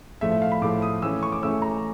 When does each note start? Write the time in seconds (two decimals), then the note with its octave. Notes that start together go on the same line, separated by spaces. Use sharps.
0.21 A2 F3 A3 E5
0.32 E5
0.42 F5
0.52 B5
0.62 A2 F3 A3 D6
0.82 D#6
1.02 E3 A3 C#4 E6
1.23 C#6
1.32 D6
1.42 E3 A3 C#4 E6
1.62 A#5